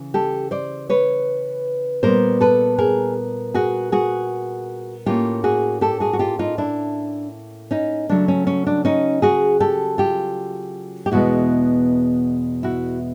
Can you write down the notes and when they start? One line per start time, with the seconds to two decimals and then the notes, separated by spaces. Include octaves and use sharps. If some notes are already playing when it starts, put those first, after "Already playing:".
Already playing: C#3 E3
0.14 G4 A4
0.51 C5 D5
0.90 B4 C#5
2.03 A#2 G3 B3 A#4 C5
2.41 A4 B4
2.78 G#4 A#4
3.54 F#4 G#4
3.92 F#4 G#4
5.06 A2 F3 A#3 C#4 F4 G4
5.44 F#4 G#4
5.81 G4 A4
6.00 F#4 G#4
6.13 F#4
6.19 F4 G4
6.39 D#4 F4
6.58 D4 E4
7.71 C#4 D#4
8.09 C#3 F#3 A3 D4
8.28 C#4
8.47 C#4
8.67 D4
8.85 C#4 D#4
9.22 F#4 G#4
9.60 G4 A4
9.98 F4 G4
11.06 G4
11.12 E2 B2 G#3 B3 E4 F#4
12.63 E4 F#4